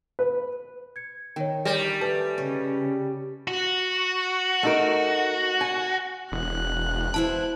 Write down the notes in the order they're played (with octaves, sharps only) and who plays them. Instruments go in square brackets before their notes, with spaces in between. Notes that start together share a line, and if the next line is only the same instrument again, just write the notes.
[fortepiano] B4
[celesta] G#6 C#7
[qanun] D#3 [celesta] C#5 G5
[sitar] G3 [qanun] A#4 C#5 G5 [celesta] A#6
[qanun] A3 [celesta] B4 G#5 A5
[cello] C#3 [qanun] C#5 D#5
[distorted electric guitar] F#4
[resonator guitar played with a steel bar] A3 D#4 A#4
G#5
[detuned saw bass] E1 [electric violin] F#6
[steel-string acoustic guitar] B3 E4 C5 [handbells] A5